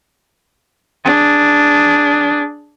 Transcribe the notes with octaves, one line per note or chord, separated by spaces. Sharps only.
D4 G#4